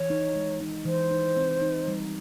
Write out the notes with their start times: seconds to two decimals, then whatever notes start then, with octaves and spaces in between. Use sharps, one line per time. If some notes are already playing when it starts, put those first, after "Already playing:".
Already playing: E3 C#5
0.10 D#4
0.35 G#3
0.61 D#4
0.85 E3 C5
1.11 D#4
1.37 C4
1.62 D#4
1.88 G3